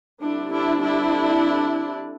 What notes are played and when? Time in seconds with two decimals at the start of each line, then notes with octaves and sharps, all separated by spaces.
0.21 D3 G3 C4 D4 E4
0.52 D4 E4
0.82 D4 E4